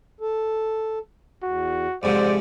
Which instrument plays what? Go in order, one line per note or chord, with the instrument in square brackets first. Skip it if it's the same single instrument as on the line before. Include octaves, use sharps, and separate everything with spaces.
[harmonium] A4
[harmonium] E2 [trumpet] F#4
[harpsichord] F2 G#2 C3 [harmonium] C5 F#5 [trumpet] D5